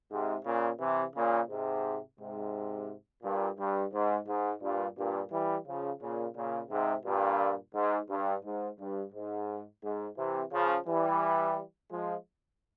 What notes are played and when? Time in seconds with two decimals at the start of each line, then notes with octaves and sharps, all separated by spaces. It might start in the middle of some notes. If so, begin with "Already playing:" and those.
0.11 G#2 C3
0.45 A#2 C#3
0.80 C3 E3
1.15 A#2 C#3
1.49 G#2 C3
2.19 G#2 C3
3.23 G2 A#2
3.58 G2
3.93 G#2
4.27 G#2
4.61 G2 A#2
4.97 G2 A#2
5.31 E3 G3
5.66 C#3 F3
6.01 A#2 C#3
6.35 A#2 C#3
6.70 G#2 C3
7.05 G2 A#2
7.74 G#2
8.10 G2
8.44 G#2
8.79 G2
9.13 G#2
9.83 G#2
10.17 C3 E3
10.52 C#3 F3
10.86 E3 G3
11.90 F3 G#3